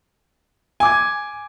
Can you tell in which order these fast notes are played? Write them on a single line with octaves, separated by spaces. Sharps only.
G#5 D6 G#6